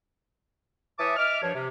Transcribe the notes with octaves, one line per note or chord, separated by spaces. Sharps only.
E3 C#5 E5 A5 D6 D#6
D#5 E5 D6 F6
G2 F3 D4 C#5
C3